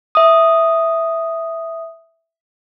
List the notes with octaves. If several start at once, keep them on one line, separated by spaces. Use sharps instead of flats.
E5 D#6